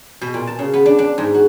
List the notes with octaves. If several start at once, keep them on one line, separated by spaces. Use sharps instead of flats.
B2
A#2
A5
C#3
B3
D4
D4
G#2
F#4